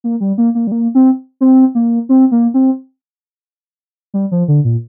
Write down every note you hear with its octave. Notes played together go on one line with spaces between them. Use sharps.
A#3
G3
A#3
A#3
G3
A#3
C4
C4
A#3
C4
A#3
C4
G3
F3
D3
A#2